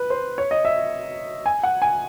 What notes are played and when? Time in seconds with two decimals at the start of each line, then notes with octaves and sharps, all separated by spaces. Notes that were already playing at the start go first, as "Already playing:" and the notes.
Already playing: B4
0.10 C5
0.38 C#5
0.51 D#5
0.65 E5
1.46 G#5
1.63 F#5
1.82 G#5